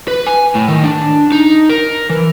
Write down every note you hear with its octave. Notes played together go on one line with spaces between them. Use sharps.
B4
G#5
A2
D#3
D4
D#4
A#4
E3